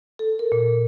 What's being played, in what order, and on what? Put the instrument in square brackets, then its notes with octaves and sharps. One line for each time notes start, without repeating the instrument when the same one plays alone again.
[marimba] A4
A#4
A#2